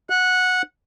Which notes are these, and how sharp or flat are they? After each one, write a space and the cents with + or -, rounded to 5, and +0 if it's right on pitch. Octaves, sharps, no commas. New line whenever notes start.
F#5 -15